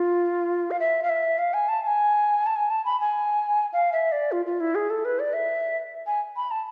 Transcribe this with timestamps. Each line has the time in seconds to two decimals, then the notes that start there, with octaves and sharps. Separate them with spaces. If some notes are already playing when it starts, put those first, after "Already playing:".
Already playing: F4
0.71 F5
0.80 E5
1.03 F5
1.09 E5
1.38 F5
1.54 G#5
1.69 A5
1.83 A5
1.87 G#5
2.46 A5
2.56 G#5
2.70 A5
2.85 B5
3.00 G#5
3.73 F5
3.93 E5
4.12 D5
4.32 F4
4.46 F4
4.60 E4
4.75 G#4
4.90 A4
5.05 B4
5.19 D5
5.33 E5
6.07 G#5
6.37 B5
6.51 A5